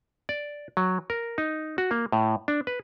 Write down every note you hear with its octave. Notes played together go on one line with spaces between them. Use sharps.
D5
F#3
A#4
D#4
F#4
A#3
A2
D4
B4